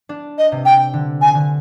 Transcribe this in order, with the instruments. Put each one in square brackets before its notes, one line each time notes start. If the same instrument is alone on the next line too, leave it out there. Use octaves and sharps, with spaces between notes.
[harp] D4
[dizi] D#5
[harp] C3
[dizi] G5
[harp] D3
[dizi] G#5
[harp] D3